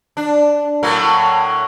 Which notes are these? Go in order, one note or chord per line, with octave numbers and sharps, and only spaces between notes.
D4
A2 F#3 A#3